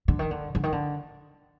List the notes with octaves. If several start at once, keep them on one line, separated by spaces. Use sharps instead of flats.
D3
D#3
D3
D3
D#3
D3